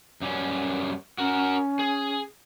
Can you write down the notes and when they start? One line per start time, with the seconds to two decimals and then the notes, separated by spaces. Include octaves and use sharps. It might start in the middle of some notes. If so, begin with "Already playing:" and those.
0.21 F#2 G3 C#4
1.18 C#4 F#4 A#4
1.79 G#4